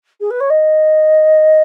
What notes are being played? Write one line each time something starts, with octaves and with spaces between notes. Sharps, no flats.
G#4
B4
C#5
D#5